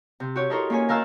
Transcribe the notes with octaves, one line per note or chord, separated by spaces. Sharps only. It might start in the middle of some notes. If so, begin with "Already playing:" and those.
C3
F#4 G4 C#5
D#4 E4 A4 A#4 C5 C#5
A#3 C#4 C#5 G#5
D#3 A#4 F5 A5 E6 F#6